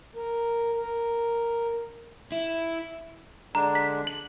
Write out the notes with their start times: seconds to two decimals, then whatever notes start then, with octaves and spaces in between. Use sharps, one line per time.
0.16 A#4
0.76 A#4
2.32 E4
3.55 D3 G#3 D4 A#5
3.75 B6
4.07 F#7